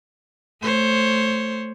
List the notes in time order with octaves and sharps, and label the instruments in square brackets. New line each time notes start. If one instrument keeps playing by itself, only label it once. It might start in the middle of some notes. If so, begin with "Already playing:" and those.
[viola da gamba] A3 C5 C#5